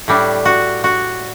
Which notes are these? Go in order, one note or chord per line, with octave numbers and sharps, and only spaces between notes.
A2 G3 D4
F#4
F#4